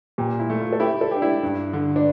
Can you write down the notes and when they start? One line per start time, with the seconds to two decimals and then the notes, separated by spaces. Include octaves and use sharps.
0.18 A#2 G4
0.39 E4
0.50 A3
0.60 F4
0.73 A4
0.80 E4 G4
1.01 A4
1.11 D4 G4
1.22 E4
1.43 G2
1.73 D3
1.96 D4